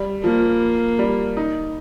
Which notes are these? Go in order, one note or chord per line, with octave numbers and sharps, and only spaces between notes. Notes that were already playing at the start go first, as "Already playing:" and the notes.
Already playing: G3
F3 A#3
G3
D#4